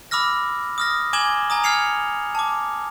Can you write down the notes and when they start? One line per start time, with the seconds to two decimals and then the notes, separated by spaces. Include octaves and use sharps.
0.11 B5 D6 E6 F6 A#6
0.78 D#6 F6 A#6
1.13 G#5 D6 G#6 E7 F#7 G7
1.50 G#5 A#5 D#6
1.64 F6 G#6 C7 C#7 F7
2.35 A5 D6